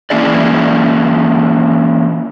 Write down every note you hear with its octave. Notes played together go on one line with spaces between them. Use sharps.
E3 A#3 C#4 E4 G#4 D5